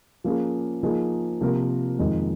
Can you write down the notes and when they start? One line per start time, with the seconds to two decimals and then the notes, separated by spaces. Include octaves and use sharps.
0.24 F3 A#3 C#4 G#4
0.83 F3 A#3 D#4 G#4
1.41 C3 F3 A#3 F4 A#4
1.99 F2 D#3 G#3 D#4